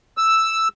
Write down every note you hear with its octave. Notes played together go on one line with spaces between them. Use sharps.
E6